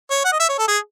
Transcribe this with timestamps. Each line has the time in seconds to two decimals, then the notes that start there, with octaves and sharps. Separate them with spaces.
0.10 C#5
0.25 F#5
0.32 D#5
0.40 E5
0.49 C#5
0.59 A4
0.68 G#4